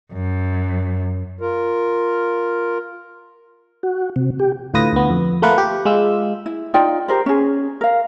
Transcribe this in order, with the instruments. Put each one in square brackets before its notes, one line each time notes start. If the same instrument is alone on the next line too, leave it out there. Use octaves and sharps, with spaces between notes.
[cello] F#2
[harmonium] F4 A#4
[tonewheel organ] F#4
C3
G4
[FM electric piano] D2 A2 F4 B4 D#6 A#6
D2 B3
F2
A3 A#3 F4 A#4 B4 F#5
G4
G#3 F4 E6
[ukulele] E4
D#4 F4 D5 G5
G4 A#4 C5
C#4 G#4
A#4 F5